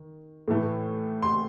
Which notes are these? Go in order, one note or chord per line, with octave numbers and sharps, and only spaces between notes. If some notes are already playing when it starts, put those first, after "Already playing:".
Already playing: D#3
A2 E3 A3
C6